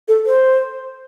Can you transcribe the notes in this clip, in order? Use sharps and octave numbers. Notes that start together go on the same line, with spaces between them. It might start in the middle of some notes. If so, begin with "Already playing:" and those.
A4
C5